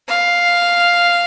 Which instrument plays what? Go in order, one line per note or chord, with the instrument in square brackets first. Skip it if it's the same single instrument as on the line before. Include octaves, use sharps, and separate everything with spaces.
[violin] F5